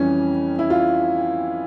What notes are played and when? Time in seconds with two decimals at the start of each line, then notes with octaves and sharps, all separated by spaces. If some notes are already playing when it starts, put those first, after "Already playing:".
Already playing: F2 E3 G3 C#4
0.59 E4
0.70 F4